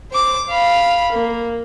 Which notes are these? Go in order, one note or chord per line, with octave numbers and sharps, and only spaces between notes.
C5 D6
F5 B5
A#3